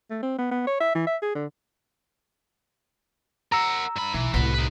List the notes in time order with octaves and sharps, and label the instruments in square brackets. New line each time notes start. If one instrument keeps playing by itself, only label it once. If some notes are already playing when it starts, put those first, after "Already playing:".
[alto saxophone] A3
C4
B3
B3
C#5
E5
E3
E5
G#4
D3
[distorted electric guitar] A#4 F#5 [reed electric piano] A#5 E6
[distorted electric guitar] G2 B5
[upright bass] B1 [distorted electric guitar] E3
[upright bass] C2 A2 [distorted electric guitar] F#4 B4
[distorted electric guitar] D#4 B4